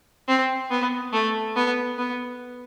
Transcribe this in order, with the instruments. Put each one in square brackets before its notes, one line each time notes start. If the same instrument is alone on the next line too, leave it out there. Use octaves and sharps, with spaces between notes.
[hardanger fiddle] C4
B3
A3
B3
B3